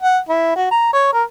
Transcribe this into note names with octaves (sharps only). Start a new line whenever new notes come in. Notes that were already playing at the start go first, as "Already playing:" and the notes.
F#5
E4
F#4
A#5
C#5
A#4